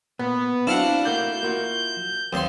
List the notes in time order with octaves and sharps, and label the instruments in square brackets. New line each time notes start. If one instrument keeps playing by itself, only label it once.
[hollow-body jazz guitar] A#2 [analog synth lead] B3
[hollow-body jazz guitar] C4 F#4 [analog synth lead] D4 [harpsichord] E4 F5 F#5
[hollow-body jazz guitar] A3 A#3 F#4 [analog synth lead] G6
[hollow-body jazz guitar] A#3 F4 F#4
[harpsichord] D#2 C6 [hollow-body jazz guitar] C4